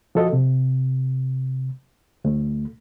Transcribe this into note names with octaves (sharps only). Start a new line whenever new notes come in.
F3 F#4 A4 D#5
C3
D2 A3